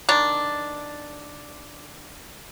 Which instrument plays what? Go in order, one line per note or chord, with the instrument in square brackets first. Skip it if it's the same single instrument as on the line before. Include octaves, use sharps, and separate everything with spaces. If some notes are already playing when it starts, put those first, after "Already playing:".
[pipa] D#3 D4